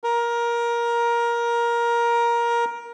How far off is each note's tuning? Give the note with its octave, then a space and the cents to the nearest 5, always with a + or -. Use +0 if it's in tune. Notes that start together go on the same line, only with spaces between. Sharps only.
A#4 +15